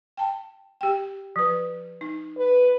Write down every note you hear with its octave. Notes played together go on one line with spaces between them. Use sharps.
G5 A5
G4 G5
F3 B4
D#4
B4